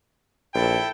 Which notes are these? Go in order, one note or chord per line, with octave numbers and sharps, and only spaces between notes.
A#1 E4 A4 G5